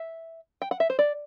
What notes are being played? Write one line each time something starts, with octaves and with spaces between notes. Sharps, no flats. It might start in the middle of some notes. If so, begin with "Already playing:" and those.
Already playing: E5
G5
F#5
E5
C5
D5